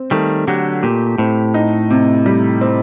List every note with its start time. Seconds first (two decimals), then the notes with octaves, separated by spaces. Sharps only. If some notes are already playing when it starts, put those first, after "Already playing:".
Already playing: C4
0.11 D#3 G3 A3
0.47 D3 F#3 G4
0.83 A#2 G4
1.18 A2 C4
1.54 D#4
1.90 C3
2.26 G3
2.61 C4